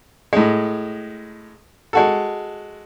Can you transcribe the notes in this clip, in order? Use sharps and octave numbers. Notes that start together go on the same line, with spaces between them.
A2 G#3
G#3 F#4 A4